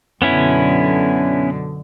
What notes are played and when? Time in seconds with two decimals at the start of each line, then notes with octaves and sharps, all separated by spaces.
0.22 F#2 B2 D3 B3 C#4 E4